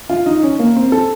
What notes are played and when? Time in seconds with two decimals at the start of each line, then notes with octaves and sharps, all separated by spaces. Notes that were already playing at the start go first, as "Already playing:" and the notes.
0.10 F4
0.26 D#4
0.43 C#4
0.59 A#3
0.76 C4
0.92 A4